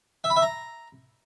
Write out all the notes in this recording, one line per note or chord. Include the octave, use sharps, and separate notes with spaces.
E5
B5
E5
A#5